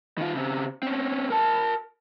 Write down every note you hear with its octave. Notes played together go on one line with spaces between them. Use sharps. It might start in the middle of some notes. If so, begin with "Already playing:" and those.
D#3 F4
C#3 C4
C4 C#4
A#4 A5